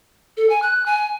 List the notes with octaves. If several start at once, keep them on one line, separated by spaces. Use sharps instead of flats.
A4
G#5
F#6
G#5